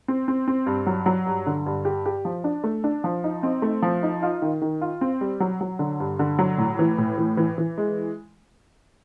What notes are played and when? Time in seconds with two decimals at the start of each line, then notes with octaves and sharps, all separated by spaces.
0.08 C4
0.28 C4
0.48 C4
0.66 G2
0.86 F#3
1.06 F#3
1.26 G2
1.46 D3
1.66 G2
1.85 G4
2.06 G4
2.25 F3
2.44 D4
2.64 A3
2.84 D4
3.04 F3
3.24 D#4
3.43 C4
3.62 A3
3.82 F3
4.03 D#4
4.23 F4
4.42 D#3
4.62 D#3
4.81 F4
5.01 C4
5.21 G3
5.40 F#3
5.61 F#3
5.79 D3
6.00 G2
6.19 D3
6.39 F#3
6.58 A2
6.79 E3
6.98 A2
7.18 E3
7.37 E3
7.58 E3
7.78 G#3